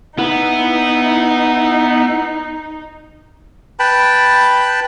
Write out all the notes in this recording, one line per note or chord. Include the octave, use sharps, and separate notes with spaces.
B3 D#4 E4
B4 G5 A5 B5